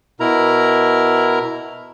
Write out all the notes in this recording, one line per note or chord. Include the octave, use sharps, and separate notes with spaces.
B2 E4 A#4 A#5